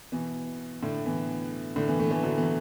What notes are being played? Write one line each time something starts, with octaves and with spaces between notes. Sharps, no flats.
B2 E3
A2 D3
B2 E3
A2 D3
B2 E3
E3 A3
E3 A3
D3 F#3
B2 E3